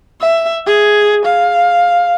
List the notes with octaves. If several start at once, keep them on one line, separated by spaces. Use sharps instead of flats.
E5
G#4
F5